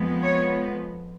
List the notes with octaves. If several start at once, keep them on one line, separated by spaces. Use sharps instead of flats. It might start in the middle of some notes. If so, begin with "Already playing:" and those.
Already playing: F2 F3 G#3 B3
C#5